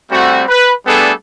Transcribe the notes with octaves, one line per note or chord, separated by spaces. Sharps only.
G3 A3 C4 F#4
B4
G3 A3 B3 D4 G#4 A4